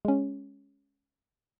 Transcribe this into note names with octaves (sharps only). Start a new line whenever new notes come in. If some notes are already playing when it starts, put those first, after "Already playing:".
G#3 C#4